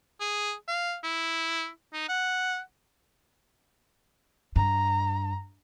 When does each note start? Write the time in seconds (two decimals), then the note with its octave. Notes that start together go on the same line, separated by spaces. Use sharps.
0.20 G#4
0.68 F5
1.04 E4
1.93 D#4
2.09 F#5
4.56 G2 A#5